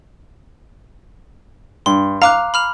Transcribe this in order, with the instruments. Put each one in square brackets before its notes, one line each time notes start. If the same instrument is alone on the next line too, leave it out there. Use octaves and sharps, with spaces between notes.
[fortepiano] G2 [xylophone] C6
[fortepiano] F5 [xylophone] A#5 D6 F#6
[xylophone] B5 F6 F7